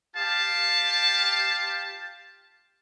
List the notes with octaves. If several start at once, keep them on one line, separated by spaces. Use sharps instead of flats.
F4 G4 F5 A5